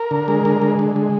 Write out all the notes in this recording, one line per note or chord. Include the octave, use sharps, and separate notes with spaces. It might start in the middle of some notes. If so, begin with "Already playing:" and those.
Already playing: A#4
D3
G#3
D3
G#3
D3
G#3